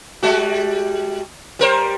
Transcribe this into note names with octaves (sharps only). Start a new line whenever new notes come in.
G3 G#3 F#4
G3 A#4 C5